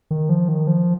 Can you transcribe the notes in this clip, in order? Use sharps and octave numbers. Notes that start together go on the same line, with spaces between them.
D#3
F3
D#3
F3